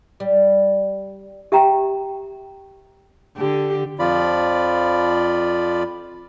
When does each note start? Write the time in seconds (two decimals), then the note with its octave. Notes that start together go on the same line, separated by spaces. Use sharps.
0.20 G3
1.52 G4 E5 G5 A#5
3.38 D3 G4
3.99 F2 F3 F4 D5 B5